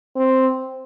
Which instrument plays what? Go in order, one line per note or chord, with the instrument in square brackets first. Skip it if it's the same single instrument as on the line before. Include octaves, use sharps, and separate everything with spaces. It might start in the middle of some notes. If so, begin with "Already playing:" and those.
[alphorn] C4